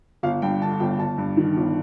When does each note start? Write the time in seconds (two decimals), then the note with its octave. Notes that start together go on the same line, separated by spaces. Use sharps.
0.23 G1 F5
0.42 G2 G5
0.61 D3 A5
0.80 G1 G5
0.99 G1 A5
1.18 G2
1.37 D#3
1.56 G1